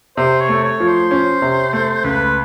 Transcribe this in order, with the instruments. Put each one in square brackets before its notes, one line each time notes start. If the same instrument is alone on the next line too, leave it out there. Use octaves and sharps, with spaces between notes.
[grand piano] C3 [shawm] C5
[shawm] C#5
[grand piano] A3
[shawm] C#5
[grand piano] F3
[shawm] C5
[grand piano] C#4
C3
A3
[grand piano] C#2 [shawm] B4